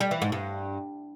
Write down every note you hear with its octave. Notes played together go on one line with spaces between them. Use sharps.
G3
E3
G#2
G2